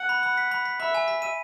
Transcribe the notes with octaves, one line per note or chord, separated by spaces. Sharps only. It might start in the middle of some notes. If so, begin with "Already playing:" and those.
Already playing: F#5
B5
B5
B6
B5
B6
E5 B5
G#5
B6
D#7